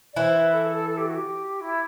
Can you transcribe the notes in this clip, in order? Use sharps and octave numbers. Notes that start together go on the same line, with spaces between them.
D5
E3 E4 C5
B4
A4
A4
A4
G4
F#4
G4
E4